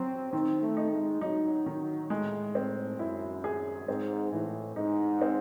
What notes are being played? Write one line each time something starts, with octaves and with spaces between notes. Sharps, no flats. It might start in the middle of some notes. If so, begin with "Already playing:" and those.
Already playing: F#3 C4
D#3 C4
A3
D#4
G#3
F#3 D#4
D#3
A2 G#3
C4
F#2 E4
G#4
G#2 C4
A2 E3
G#2 D#4
C4